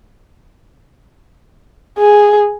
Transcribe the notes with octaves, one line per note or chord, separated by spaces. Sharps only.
G#4